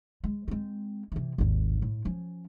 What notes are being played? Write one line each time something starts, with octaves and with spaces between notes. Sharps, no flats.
G#3
G#3 C4
C3 E3
G#1 D#2
A2
F3 C#4